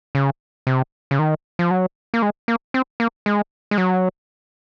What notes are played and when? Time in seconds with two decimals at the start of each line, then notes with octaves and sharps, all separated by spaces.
0.15 C#3
0.67 C3
1.11 C#3
1.19 D#3
1.59 F3
1.71 F#3
2.14 A#3
2.22 G#3
2.48 A#3
2.74 C4
3.00 A#3
3.26 G#3
3.71 G#3
3.78 F#3